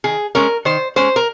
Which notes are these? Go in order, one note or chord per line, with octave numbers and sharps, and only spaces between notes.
D#3 G#4
G#3 C#4 A#4
D#3 C5
G#3 C#4 C5
A#4